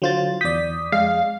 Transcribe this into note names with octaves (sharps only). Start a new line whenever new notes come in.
D3 F#3 F4 C5 A6
E2 D5 D#6 G6 B6
F2 G#3 F5